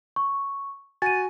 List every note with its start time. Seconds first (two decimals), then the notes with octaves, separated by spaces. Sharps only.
0.16 C#6
1.02 F#4 G#5 A6 D#7